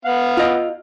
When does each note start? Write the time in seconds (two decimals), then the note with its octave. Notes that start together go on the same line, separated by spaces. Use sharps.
0.05 B3 F5 F#5
0.37 F4 D#5